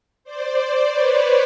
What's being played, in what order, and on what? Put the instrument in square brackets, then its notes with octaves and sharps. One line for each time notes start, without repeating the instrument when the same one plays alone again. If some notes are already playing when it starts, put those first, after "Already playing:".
[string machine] C5 D5
B4 C#5